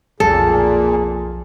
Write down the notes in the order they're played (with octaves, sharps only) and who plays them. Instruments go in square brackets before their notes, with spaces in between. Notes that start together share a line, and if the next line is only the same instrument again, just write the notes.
[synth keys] B1 F2 F3 [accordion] A#2 [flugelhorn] G#4 [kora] A4